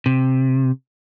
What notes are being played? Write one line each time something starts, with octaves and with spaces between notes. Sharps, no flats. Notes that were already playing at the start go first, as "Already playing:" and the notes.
C3